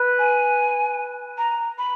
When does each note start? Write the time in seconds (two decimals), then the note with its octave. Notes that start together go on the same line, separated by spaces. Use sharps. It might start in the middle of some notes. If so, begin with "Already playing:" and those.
Already playing: B4
0.19 G#5
1.38 A#5
1.78 B5